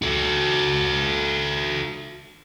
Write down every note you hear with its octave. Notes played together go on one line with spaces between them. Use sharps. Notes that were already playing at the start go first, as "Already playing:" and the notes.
F#4 A4